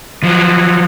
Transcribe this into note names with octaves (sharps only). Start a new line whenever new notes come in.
F3 F#3